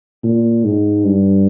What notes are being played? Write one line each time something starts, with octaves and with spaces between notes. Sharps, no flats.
A#2
G#2
G2